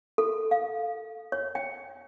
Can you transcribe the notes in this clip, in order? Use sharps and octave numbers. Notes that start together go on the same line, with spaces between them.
A4
F5
C#5
G5